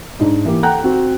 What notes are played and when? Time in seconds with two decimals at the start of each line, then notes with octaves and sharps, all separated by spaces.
0.19 G#2 D4 D#4
0.45 E3 A#3 G4
0.63 A4 F#5 G5 A#5 F#6
0.83 C4 F#4